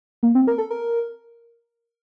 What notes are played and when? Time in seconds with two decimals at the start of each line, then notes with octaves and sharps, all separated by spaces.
0.23 A#3
0.35 C4
0.47 A#4
0.58 A4
0.70 A#4